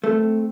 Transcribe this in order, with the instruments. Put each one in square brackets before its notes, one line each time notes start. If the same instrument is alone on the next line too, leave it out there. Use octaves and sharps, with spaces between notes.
[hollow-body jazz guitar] A3 [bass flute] C4